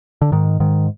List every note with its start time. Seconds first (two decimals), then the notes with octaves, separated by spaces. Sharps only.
0.22 D3
0.32 G#2 D#3
0.60 G#2 D#3